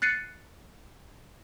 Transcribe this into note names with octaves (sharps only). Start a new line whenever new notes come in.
F#6 A6 C7 C#7 D#7